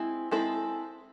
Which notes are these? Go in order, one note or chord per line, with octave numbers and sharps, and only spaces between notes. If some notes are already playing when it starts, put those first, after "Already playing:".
Already playing: G#3 C4 E4
G#3 C4 E4 A4